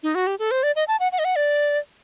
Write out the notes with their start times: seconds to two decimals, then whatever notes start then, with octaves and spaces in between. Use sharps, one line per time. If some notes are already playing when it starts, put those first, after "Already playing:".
0.03 D#4
0.15 F#4
0.27 G4
0.39 A4
0.51 C5
0.63 D5
0.76 D#5
0.88 A5
1.00 F#5
1.12 F#5
1.19 D#5
1.25 F#5
1.36 D5